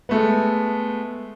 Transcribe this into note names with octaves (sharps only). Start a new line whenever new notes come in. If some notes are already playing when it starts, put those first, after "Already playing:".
G#3 A3 B3